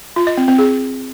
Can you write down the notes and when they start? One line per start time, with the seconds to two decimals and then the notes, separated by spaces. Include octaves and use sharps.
0.16 F4
0.27 D#5
0.37 C4
0.48 C4
0.59 G#4